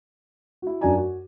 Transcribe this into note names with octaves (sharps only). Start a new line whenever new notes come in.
E4 F#4
F#2 D4 F#4 D5 G#5 A#5
F#4